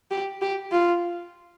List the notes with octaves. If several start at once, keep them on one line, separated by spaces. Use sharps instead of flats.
G4
G4
F4